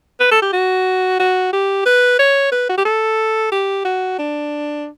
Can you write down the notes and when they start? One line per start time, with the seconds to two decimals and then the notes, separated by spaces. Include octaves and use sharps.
0.20 B4
0.31 A4
0.42 G4
0.53 F#4
1.20 F#4
1.53 G4
1.86 B4
2.19 C#5
2.52 B4
2.69 F#4
2.78 G4
2.85 A4
3.52 G4
3.85 F#4
4.19 D4